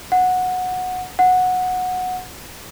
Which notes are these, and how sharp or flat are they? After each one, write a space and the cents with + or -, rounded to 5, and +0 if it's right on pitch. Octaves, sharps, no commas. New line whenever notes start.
F#5 -10
F#5 -10